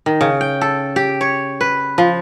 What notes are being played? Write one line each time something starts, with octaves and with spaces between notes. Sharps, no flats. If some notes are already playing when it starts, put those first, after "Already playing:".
D#3
C#3
G5
A4
G4
C#5
B4
F3